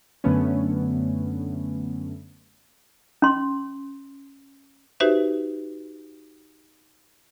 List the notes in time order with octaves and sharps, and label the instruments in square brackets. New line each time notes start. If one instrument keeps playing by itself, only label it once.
[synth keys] F#2 D3 A3 B3 C#4
[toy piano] C#4 C6
[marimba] D#4 F#4 G4 B4 C5 E5